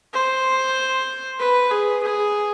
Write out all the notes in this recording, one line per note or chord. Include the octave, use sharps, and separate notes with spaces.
C5
B4
G#4
G#4